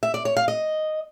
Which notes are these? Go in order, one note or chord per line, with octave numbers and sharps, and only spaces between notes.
E5
D5
C#5
F5
D#5